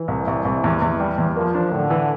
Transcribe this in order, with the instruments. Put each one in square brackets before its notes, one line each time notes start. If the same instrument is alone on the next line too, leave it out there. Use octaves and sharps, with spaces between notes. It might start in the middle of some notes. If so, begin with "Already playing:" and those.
Already playing: [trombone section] E3
[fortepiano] C2
C2
C2
E2
E2
G3
E2
[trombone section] F3 [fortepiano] A#3
[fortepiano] D4
[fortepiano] A2 [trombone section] D3
[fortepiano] E3